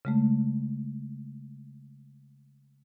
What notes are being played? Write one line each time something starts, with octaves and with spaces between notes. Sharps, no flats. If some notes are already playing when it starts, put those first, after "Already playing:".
C#3 G#3 A3